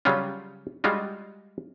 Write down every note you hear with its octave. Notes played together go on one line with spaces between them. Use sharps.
C#3 F#3 G3 C#4 F4
G3 G#3 F4 F#4